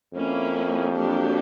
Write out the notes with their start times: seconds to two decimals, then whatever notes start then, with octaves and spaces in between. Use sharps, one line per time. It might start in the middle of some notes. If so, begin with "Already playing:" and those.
0.13 F2 A#3 C#4 E4
0.94 F#3 A#3 D4 G4